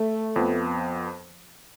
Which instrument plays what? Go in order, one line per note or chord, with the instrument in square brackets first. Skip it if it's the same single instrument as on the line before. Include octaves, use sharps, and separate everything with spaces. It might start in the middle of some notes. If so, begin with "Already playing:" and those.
Already playing: [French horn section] A3
[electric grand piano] F2 F3 B3